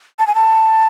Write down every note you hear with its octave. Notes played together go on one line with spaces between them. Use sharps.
A5
G#5
A5